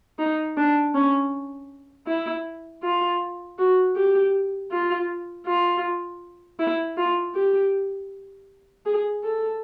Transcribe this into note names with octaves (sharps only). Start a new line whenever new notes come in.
D#4
D4
C#4
E4
F4
F#4
G4
F4
F4
E4
F4
G4
G#4
A4